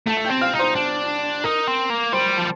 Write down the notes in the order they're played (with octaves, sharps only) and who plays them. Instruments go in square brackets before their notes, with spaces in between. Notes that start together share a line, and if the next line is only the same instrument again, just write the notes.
[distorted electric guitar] A3 [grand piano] A5 A6
[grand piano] A6
G5 G6
[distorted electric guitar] C4
[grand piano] F5 F6
[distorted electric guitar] D#4
[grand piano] C5 C6
[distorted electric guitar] D4
[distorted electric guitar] D#4 [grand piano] A#4 A#5
[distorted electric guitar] C4
A#3
[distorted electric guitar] G3 [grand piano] C5 C6
[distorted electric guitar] F3 [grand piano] A5